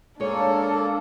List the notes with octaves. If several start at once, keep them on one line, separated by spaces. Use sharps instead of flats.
G#3 A#3 D4 A4 C#5